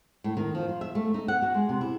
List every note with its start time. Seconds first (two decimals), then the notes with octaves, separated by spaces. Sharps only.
0.24 A2
0.37 D#3
0.55 F3
0.69 F4
0.81 E5
0.95 A3
1.14 D#4
1.28 F#5
1.42 F#4
1.54 G#3
1.69 C3
1.81 E4